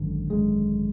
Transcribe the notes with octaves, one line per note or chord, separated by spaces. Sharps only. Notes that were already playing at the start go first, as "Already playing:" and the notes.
Already playing: G#1 F#2 D3
G#1 F#2 D3 G#3